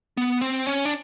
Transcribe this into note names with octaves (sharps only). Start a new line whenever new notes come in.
B3
C4
C#4
D4